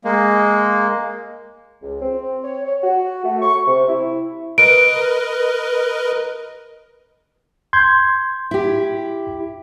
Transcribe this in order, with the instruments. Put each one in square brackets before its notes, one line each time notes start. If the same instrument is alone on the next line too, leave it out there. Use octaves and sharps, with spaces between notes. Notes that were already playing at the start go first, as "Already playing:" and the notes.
[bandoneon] G#3 A#3
[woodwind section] C#2
C4
C#5
C#5
F#4
A3
C#6
C3
E4
[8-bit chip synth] A#4 B4 D#5 [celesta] D7
[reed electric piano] C6 G6 G#6
[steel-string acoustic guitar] E4 G4